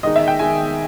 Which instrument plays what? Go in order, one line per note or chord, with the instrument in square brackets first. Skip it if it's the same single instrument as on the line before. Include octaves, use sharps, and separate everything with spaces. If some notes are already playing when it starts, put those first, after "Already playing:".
[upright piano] D#3 G#3 D#4 D#5
E5
G5
D#3 G#3 D#4 G#5